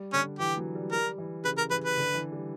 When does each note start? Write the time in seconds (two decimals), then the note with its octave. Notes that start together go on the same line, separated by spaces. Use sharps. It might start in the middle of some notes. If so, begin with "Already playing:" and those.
Already playing: G3
0.13 D3 C#4
0.39 E3 G4
0.57 F#3
0.75 G3
0.92 G3 A#4
1.18 E3
1.44 C#3 B4
1.58 A#4
1.71 E3 B4
1.84 B4
1.97 D3
2.14 E3
2.32 G3